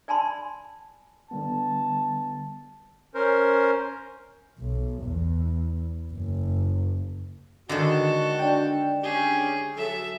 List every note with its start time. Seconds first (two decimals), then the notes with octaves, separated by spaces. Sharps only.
0.08 D5 G#5 A5 B5 C6
1.31 D3 G3 B3 A5
3.15 C#4 A#4 C5
4.59 B1
5.02 E2
6.12 F#1
7.69 D3 D#3 G#3 F#4 A4
8.39 D4 G5
9.04 C#4 G4 G#4
9.77 F#3 G#4 A4 E5